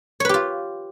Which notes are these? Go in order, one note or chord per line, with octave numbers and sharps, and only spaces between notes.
F4 G4 B4 C#5